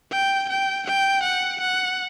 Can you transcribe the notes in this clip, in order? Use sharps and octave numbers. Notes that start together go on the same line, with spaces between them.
G5
G5
G5
F#5
F#5